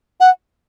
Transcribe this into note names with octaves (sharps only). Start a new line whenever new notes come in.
F#5